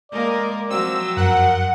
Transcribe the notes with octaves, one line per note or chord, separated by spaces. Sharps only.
G#3 A#3 A#4 D5
F3 F#3 C4 E6
F#2 A#4 F#5